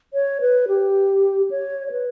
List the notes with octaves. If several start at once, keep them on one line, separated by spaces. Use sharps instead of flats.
C#5
B4
G4
C#5
C#5
B4